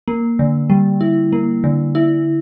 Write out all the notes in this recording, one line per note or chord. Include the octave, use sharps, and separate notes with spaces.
A#3
D3
G3
E4
A#3
D3
E4